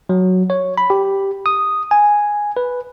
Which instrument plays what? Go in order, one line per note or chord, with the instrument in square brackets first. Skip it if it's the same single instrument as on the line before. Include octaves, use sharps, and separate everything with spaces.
[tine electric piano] F#3
C#5
B5
G4
D#6
G#5
B4